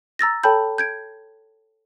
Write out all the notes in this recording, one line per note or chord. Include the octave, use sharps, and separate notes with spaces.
A#5 E6 A6 A#6
A4 C#5 G5 A5 B5 G6
G6 G#6 D7